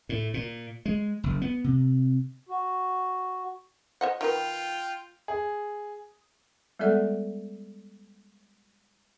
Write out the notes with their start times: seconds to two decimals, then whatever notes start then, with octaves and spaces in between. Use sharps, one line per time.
0.09 A2
0.34 A#2
0.86 G#3
1.24 F#1
1.42 B3
1.64 C3
2.49 F#4
4.01 C5 D#5 F#5
4.21 D#3 F4 B4 G5
5.28 G#4
6.79 G3 G#3 B3 A4 D5 F#5